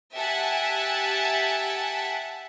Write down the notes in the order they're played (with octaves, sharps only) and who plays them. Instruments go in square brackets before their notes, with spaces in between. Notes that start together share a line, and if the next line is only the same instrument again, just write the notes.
[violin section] G4 E5 F#5 G#5 A5